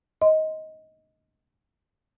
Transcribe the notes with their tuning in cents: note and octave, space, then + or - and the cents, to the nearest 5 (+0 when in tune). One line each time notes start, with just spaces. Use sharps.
D#5 +15 C6 -15